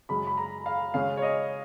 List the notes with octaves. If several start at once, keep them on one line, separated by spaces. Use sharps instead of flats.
F#2 C#3 G#3 B5
B5
A#5
F5
C#3 G#3 C#4 F5
C#5
D#5